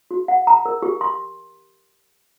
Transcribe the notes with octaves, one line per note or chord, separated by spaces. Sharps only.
F#4
F#5
A#5
A#4
G4
C6